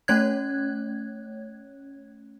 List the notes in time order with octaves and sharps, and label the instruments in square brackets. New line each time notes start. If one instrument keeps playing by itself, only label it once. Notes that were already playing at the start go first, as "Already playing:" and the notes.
[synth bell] A3 C#4 C#5 F#6 G#6